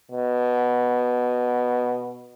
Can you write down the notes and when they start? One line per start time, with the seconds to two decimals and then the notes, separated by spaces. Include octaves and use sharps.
0.11 B2